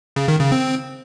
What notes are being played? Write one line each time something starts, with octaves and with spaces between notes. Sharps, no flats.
C#3
D#3
C#3
C4